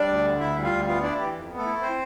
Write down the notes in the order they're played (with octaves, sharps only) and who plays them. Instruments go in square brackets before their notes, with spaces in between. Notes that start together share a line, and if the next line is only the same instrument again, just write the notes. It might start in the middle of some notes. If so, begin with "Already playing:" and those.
Already playing: [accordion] G3 D4 D5
D2
D3
D2 E4 E5
G3
F4 F5
D2
B3 F4 F5
D4 E4 D5
E3 G4
F2
B3
A3 A4
E4
C4 C5